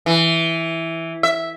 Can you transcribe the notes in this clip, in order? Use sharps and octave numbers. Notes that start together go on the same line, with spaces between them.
E3
E5